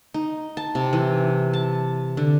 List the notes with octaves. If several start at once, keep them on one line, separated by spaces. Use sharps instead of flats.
D#4
A5
C3
E3
A5
D3